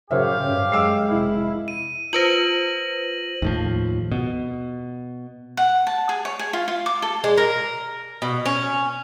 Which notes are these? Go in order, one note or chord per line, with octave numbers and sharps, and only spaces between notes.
F#2 A2 C#3 G4 C5 C#5 E5 F5
G2 C#4
F#2 G#3 D6 E6 C7
F1 E4
D#7
F4 B4 C5 A#6 F#7
D#2 A2 F3
B2
F#5
A5
G#4
C#5
G#4
F4
F4
D6
A4
G#3
A#4
B2
C#4